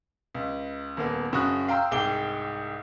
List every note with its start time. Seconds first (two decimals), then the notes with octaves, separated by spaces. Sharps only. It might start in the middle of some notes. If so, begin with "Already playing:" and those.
0.34 C#2
0.97 D#1 A#3 B3
1.32 F#1 C#3 F#4 C#6 D#6 F#6
1.68 F5 G5 A#5 C6 E6
1.91 C2 G#2 G#4 G5 D6 G7